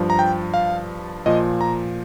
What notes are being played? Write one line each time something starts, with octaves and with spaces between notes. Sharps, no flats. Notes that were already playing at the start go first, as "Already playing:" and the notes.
Already playing: G2 F3
A#5
G5
F5
A#2 F3 D#5
A#5